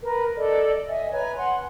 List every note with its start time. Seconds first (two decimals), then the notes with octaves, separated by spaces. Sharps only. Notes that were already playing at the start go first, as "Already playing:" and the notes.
0.02 A#4 B4
0.36 A4 D5 D#5
0.88 D#5 E5 G#5
1.12 B4 C#5 G#5 A#5
1.36 F#5 G#5 C6